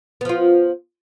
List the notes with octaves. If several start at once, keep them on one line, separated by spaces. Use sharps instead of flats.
F3 B3 F4